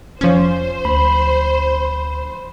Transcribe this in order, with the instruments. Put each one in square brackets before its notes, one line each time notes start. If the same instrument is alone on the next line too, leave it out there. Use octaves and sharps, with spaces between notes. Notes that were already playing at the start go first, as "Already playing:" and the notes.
[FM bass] F1 [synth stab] F3 C#4 [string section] C5
[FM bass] D2 [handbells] B5